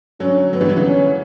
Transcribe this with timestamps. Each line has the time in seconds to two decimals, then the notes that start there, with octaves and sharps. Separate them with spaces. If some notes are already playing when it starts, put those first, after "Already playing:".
0.20 D3 F#3 C#4
0.53 D3 F#3 B3
0.61 E3 G3
0.69 D3 F#3
0.76 C#3 E3
0.85 C#4